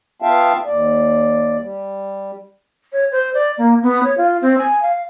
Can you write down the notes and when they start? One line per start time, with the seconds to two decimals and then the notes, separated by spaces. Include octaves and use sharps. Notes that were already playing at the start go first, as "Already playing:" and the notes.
0.22 B3 F4 E5 F5 G5 A5
0.65 D#2 D5
1.60 G3
2.92 C#5
3.11 C5
3.34 D5
3.57 A#3
3.82 B3
4.03 C#5
4.17 F4
4.41 C4
4.58 G#5
4.82 F5